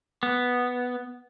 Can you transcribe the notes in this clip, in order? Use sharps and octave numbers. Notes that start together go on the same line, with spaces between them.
B3